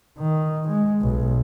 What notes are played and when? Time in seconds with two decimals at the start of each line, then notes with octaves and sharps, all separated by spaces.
0.19 D#3
0.68 G#3
1.02 B1